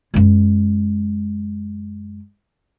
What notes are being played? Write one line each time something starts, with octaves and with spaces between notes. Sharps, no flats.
F#2 G#3